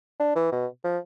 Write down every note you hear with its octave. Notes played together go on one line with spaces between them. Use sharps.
D4
E3
B2
F3